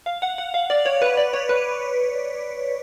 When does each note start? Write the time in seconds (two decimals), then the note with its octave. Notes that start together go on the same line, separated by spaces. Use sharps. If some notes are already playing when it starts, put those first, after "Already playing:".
0.06 F5
0.22 F#5
0.38 F#5
0.54 F5
0.70 D5
0.85 C#5
1.02 B4
1.17 D5
1.33 C#5
1.49 B4